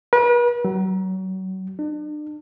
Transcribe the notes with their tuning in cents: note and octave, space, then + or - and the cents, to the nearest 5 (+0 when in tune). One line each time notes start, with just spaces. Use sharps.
B4 -40
F#3 +30
D4 +40